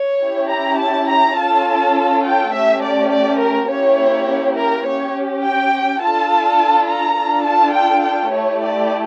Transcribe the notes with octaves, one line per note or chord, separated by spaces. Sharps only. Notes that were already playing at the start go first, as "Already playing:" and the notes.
Already playing: C#5
C#4 E4 G4
A#5
A5
A#5
C#4 F4 A4 A5
G5
A3 C#4 G4 E5
D5
D5
A#4
A#3 C#4 E4 G4 C#5
A#4
C#4 G4 C#5
G5
D4 F4 A4 A5
A#5
D4 F4 A4
A5
G5
G5
A3 E4 G4 C#5
D5